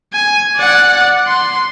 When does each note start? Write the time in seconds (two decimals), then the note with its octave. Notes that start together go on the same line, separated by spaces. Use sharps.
0.13 G#5
0.57 D5 F#5
1.27 C6